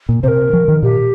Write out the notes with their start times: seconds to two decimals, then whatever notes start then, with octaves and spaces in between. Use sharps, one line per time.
0.09 A#2
0.23 C3 A#4 C5
0.53 F3
0.68 D#3
0.83 A#2 G4